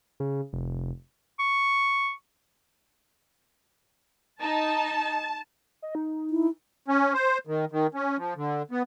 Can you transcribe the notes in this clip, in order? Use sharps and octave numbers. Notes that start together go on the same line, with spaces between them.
C#3
F1
C#6
D#4 A5
D#5
D#4
E4
C#4
C5
D#3
D#3
C#4
F3
D3
B3